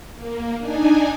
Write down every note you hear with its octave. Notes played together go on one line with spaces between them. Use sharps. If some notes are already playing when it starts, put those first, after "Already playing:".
A#3
D4 D#4 G#5